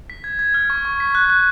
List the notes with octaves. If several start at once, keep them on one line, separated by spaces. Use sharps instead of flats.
B6
G#6
G#6
F6
C#6
C#6
B6
F#6
F#6